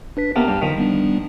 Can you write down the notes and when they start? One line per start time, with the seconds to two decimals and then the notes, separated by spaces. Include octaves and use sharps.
0.17 D4 B4 B6
0.36 C3 A#3 B3 A5 F6
0.47 G2 G3
0.62 D3 D#3 F3 B6
0.78 G3 B3 D4